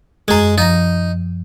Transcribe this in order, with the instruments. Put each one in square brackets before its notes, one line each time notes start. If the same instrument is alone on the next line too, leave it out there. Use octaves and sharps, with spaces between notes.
[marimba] F#2 G#6 [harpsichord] G#3 G#4
[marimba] F3 A#5 A#6 [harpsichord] D#4